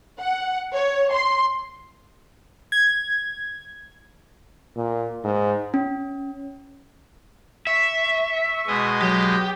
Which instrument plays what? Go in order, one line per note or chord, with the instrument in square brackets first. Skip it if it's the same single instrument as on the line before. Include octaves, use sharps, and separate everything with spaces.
[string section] F#5
C#5
C6
[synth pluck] G#6
[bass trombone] A#2
G#2
[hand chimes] C#4
[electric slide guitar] E5 [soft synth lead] C#6
[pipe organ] B2 G#3 D#5
[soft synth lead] F#3 [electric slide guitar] G4